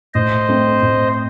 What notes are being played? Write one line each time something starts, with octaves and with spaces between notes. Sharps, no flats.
A2 C5 D#5
A3 C4
A2